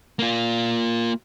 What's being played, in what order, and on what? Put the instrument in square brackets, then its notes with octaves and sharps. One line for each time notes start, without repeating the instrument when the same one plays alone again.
[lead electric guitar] A#3 F4